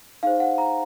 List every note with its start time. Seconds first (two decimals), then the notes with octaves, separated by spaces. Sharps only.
0.23 D#4 G#4 C5 F5
0.40 F#5
0.58 A#5